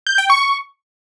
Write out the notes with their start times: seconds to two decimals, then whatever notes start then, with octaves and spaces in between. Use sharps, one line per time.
0.07 G6
0.18 G5
0.30 C#6